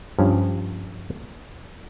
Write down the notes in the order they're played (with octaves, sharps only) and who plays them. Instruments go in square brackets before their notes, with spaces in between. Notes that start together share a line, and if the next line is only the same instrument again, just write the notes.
[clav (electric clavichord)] G2 F3 C#4